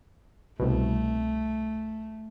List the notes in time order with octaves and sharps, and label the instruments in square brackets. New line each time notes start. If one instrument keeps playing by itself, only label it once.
[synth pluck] C2 B2 [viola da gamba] A3